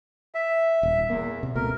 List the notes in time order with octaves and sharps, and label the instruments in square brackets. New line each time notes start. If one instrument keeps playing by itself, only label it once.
[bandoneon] E5
[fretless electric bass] D#1
[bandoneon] E2 [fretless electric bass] A#3
[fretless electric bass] C3
[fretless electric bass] C#2 B2 A3 [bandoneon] A#4